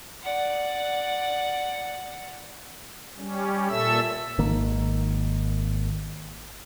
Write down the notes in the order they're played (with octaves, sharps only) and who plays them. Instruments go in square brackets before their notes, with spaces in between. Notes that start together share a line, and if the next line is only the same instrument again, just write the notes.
[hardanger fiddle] D5 F#5
[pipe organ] G3 C#4
A#2 A4 E5 E6
[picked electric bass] G#1 D#3 A#3